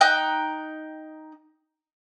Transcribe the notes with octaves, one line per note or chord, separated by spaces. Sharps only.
D#4 G5 F#6 G6